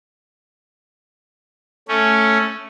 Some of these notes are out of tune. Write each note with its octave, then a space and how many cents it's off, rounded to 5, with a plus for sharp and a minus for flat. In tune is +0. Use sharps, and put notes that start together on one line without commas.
A3 +0 C#4 +0